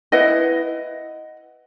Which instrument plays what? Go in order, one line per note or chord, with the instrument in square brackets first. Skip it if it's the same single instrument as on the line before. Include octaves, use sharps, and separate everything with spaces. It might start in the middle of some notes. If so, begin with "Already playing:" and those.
[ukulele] E4 B4 D#5 F#5